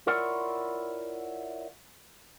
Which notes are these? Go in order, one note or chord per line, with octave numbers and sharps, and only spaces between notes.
E4 F4 A#4 C#5 D5 F#5